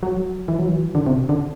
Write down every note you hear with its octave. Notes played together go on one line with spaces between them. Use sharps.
F#3
E3
F#3
E3
D3
C3
D3